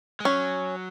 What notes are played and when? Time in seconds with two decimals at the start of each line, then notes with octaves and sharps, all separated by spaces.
0.20 G#3
0.25 F#3 C#4